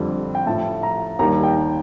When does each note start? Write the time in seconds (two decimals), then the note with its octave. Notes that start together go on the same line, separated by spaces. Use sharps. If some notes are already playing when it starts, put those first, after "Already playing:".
Already playing: F2 D3 G3
0.35 G5
0.46 A2 F3 A5
0.83 A#5
1.19 D#2 D#3 G3 A#5
1.43 G5